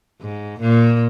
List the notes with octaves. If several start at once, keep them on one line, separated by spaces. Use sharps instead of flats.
G#2
A#2